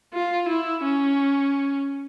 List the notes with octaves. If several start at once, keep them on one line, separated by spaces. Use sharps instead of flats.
F4
E4
C#4